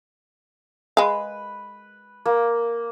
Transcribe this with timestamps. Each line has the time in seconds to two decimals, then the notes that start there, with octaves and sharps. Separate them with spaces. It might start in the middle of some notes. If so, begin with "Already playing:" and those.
0.97 G#3 B4 F5
2.25 A#3